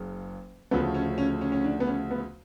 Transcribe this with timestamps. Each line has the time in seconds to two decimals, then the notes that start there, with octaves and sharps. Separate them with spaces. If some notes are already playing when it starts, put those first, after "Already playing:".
Already playing: F#1 F#2 C#3
0.71 D2 C#3 F3 A3 B3
0.94 C#4
1.18 C#4
1.41 C#4
1.52 C#4
1.64 D4
1.80 B3
1.87 C#4
2.11 B3